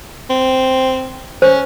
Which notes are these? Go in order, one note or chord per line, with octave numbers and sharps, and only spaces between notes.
C4
C#4 C5